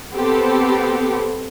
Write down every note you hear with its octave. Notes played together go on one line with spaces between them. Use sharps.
B3 C4 G4 A4